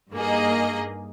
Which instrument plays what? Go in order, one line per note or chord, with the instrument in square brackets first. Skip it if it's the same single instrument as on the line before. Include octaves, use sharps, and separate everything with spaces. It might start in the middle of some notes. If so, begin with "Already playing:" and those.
[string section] G2 A#3 D#4 G#4 D#5